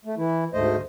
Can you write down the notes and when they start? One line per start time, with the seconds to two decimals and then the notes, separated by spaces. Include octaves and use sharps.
0.05 A3
0.17 E3 E4
0.53 D2 G#2 A3 C5 D#5